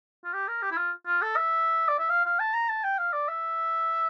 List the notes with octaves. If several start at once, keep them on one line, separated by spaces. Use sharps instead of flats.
F4
G4
A#4
G4
E4
F4
F4
A4
E5
D5
E5
F5
F5
A5
A#5
A5
G5
F5
D5
E5